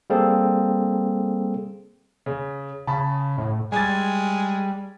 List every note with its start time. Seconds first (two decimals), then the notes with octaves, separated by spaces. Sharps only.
0.10 G3 A#3 C4 G#4 A4
2.26 C#3
2.87 C#3 A5 B5
3.38 A2
3.72 G3 G#3 G#5 G#6 A6